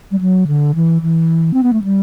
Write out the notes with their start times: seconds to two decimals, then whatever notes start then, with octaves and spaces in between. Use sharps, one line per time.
0.12 G3
0.21 F#3
0.48 D3
0.75 E3
1.02 E3
1.54 C4
1.63 B3
1.73 A3
1.84 G3